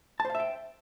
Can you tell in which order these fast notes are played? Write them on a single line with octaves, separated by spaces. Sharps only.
A5 C5 F5 E5 G5